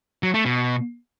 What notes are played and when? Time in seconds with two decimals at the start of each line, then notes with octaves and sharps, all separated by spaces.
0.23 F#3
0.34 A3
0.45 B2